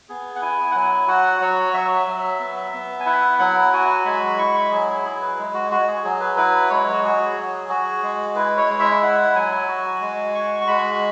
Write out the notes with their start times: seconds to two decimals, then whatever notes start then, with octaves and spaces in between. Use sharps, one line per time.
0.09 B3 G#4
0.36 F#5
0.42 E4 G#5
0.71 F#5
0.74 F#3 G#5
1.08 F#4 F#5
1.40 F#3 C#5
1.74 F#3 E5
2.08 F#3
2.40 B3
2.73 B3
3.00 G#5
3.06 E4 F#5
3.39 F#3 F#5
3.73 F#4 G#5
4.05 G#3 B5
4.38 E4 C#6
4.55 B5
4.71 F#3 G#4
5.05 E4 G#4
5.21 B4
5.38 G#3
5.54 F#4
5.71 F#4
5.88 G#4
6.04 F#3 G#4
6.20 B4
6.37 E4 B4
6.70 G#3 C#5
6.92 F#4
7.03 F#4 G#4
7.37 F#3
7.69 F#4 G#4
8.03 G#3
8.35 E4 B4
8.57 C#5
8.69 G#3
8.80 E5
9.01 E4 F#5
9.35 F#3 G#5
9.68 F#4
10.01 G#3
10.34 F#4 C#6
10.61 C#6
10.68 G#3 B5